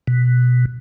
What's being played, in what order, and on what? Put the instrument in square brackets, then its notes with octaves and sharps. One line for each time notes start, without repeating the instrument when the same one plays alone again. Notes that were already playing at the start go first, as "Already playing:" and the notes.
[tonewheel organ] B2